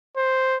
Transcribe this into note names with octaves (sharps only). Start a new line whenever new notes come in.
C5